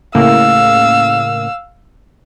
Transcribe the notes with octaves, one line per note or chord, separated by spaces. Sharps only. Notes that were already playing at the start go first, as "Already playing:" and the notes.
A2 C#3 A#3 F5 E6